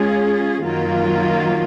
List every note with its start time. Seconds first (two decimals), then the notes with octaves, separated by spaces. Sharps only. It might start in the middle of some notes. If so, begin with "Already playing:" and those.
Already playing: G#3 C#4 F4 G#4
0.63 F#2 D#3 F#3 A#3 F4